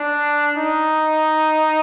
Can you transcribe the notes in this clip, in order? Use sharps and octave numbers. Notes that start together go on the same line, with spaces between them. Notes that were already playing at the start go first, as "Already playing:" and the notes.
Already playing: D4
D#4